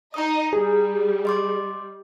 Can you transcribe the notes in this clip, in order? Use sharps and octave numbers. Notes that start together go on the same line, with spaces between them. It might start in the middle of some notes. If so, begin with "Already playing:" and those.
D#4 D#5 A#5 D#6
G3 G#4
D#5 C6 D6